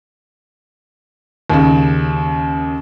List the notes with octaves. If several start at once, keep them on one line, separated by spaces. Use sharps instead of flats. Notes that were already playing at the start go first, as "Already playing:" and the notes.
D#2 C#3